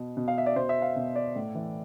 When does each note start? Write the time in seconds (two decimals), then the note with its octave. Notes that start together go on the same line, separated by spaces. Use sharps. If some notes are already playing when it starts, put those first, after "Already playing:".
Already playing: B2
0.17 B2
0.28 F5
0.38 E5
0.46 D5
0.56 B2 C5
0.69 E5
0.82 F5
0.96 B2
1.16 D5
1.36 A2
1.55 E3